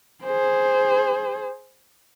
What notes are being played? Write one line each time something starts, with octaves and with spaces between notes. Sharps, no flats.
G#4 C5